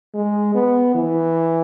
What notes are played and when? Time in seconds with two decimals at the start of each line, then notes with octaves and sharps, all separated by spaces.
0.14 G#3
0.55 B3
0.95 E3